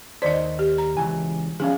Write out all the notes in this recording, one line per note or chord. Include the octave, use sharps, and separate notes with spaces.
D#2 C5 D5 D#5
G4
A#5
C#2 E3 G#5
F3 C#4 G#4 F5